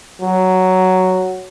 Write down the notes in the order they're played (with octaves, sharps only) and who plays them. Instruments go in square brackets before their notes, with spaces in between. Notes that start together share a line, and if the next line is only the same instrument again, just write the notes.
[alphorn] F#3